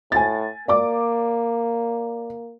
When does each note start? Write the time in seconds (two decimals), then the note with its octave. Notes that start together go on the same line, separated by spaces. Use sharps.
0.12 A2 G#5 A6
0.68 A#3 D5 D6